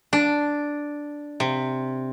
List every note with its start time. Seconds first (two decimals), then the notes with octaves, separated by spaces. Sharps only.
0.13 D4
1.40 C3